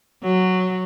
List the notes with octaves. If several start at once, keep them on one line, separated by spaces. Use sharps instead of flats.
F#3